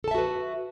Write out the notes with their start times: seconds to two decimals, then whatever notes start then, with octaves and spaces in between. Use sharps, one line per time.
0.04 A4
0.08 A5
0.11 E5
0.15 F#4
0.18 B4